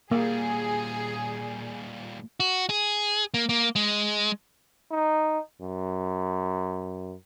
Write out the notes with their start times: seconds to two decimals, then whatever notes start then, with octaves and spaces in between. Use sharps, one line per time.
0.11 A#2 G3 A#3 G#4
2.40 F#4
2.70 G#4
3.34 A#3
3.49 A#3
3.76 G#3
4.91 D#4
5.61 F#2